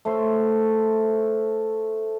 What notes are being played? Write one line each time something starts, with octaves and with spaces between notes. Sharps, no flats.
A3 C5 E5